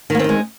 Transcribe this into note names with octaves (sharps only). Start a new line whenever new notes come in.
D#3 G#3 A#3 C4 D#4